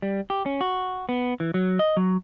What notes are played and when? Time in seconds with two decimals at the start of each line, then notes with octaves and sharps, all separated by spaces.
0.02 G3
0.30 G4
0.46 C#4
0.61 F#4
1.09 B3
1.40 E3
1.54 F#3
1.79 D#5
1.97 F#3